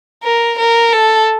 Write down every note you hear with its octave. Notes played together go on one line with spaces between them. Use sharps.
A#4
A#4
A4